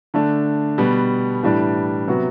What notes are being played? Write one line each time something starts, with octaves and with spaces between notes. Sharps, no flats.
D3 A3 D4
B2 G3 B3
A2 E3 G3 D4
C3 F#3 B3 F#4